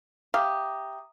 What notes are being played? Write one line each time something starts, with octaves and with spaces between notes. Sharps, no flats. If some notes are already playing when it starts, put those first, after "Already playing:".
G4 E5 F5 A#5 D#6